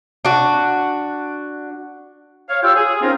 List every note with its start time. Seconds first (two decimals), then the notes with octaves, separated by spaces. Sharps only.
0.25 D4 F#4
2.49 C#5 F5
2.63 F4 G4 C#5 F5 G5 E6
2.76 G#4
3.02 C4 C#4 D#4 F4 A#4 C5